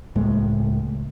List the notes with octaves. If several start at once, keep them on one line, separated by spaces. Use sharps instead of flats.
C#2 A2 G#3 A#3